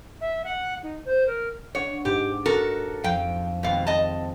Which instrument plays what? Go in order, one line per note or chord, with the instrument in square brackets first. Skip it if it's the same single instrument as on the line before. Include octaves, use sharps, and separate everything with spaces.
[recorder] E5
F#5
D#4
C5
A#4
[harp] D4 F#5 [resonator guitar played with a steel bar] C#5
[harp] G#2 [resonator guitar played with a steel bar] G4
[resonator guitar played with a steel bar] F#4 A4 A#4
[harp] F2 F3 [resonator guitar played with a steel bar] F5 G5
[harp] G#1 C4 [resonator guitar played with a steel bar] B2 F5
[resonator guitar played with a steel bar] D#5 A5